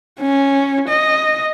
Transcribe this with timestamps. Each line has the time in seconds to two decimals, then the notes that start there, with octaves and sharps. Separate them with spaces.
0.20 C#4
0.88 D#5